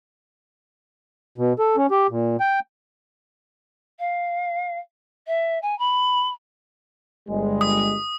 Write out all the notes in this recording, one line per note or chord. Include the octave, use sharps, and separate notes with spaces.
B2
A4
C#4
G4
A#2
G5
F5
E5
G#5
B5
G1 G3 G#3
D#6